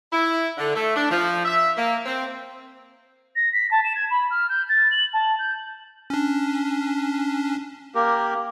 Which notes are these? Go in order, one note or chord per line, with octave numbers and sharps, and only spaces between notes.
E4
D3
A3
D4
F3
E5
A#3
C4
A#6
B6
A5
E7
G#6
B5
F6
G6
A6
F#7
A5
G6
C#4 D4
A#3 G4 A#4